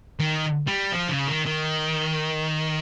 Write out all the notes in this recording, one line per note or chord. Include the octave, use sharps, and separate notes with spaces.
D#3
G3
F3
C#3
D#3
D#3